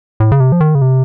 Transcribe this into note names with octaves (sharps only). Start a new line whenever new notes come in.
A2
C#3
C3
F3
D#3
C#3
C3